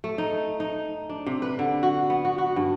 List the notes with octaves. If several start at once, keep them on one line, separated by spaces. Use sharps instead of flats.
A3
D#4
D#4
D4
C3
B4
D3
F#4
B3
F#4
F#4
G2